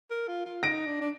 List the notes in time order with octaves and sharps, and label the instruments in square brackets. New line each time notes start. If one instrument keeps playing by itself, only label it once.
[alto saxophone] A#4
F4
F4
[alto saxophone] D#4 [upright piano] A#6 D7
[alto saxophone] D4
D4